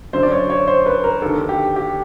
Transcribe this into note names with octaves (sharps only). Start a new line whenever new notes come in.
F#2 D3 C5
D5
C#5
C#5
C5
B4
A#4
D#2 D3 A4
G4
G4